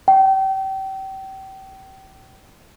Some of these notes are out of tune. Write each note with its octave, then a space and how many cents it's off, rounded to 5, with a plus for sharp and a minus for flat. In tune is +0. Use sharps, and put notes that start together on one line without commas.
G5 -30